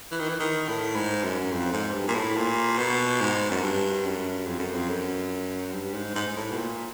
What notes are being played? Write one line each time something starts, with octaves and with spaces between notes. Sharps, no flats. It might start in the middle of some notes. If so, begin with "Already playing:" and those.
E3
D#3
E3
D#3
A2
G#2
F#2
F2
G#2
G2
A#2
A2
A#2
B2
G#2
F#2
G2
F#2
F2
F#2
F2
F#2
G2
G#2
G#2
G#2
A2
B2
A#2